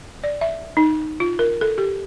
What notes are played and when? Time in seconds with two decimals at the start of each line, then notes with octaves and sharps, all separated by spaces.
0.24 D5
0.41 E5
0.77 D#4
1.20 F4
1.39 A#4
1.61 A4
1.78 G4